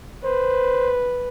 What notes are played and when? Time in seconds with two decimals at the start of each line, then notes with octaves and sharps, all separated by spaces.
0.24 B4 C5